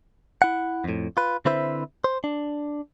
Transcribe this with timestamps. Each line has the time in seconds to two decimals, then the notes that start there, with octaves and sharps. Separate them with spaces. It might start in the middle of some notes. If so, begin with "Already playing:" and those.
0.42 E4 F#5
0.84 F2 A2
1.17 F4 B4
1.45 D3 C4 E4 B4 C5 E5
2.04 C5
2.24 D4